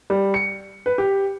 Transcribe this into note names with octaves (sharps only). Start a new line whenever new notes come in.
G3
C#7
B4
G4